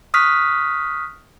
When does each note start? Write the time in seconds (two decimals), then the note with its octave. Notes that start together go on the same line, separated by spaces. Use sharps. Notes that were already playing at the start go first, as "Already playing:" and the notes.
0.14 C#6 D#6 F6 F#6 B6